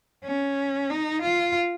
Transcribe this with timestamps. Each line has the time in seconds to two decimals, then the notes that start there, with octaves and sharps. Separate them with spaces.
0.24 C#4
0.90 D#4
1.22 F4